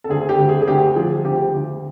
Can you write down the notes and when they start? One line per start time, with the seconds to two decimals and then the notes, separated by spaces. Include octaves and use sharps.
0.04 A4
0.09 D2 G#4
0.29 G4
0.38 D2
0.49 G#4
0.62 G#4
0.67 D2 G4
0.96 F3 G#4
1.25 D2 G4
1.54 D2